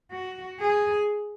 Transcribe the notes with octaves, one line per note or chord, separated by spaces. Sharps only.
F#4
G#4